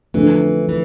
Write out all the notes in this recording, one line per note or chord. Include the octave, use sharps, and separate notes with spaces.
F2 D3 E3 A3 D4
E3